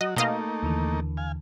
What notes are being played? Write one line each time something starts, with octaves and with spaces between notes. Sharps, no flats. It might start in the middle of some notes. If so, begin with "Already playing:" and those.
F#3 F#4 D#5
B2 A3 A#3 D#4 D#5 F5
D#2 D3 E3
F5 G#5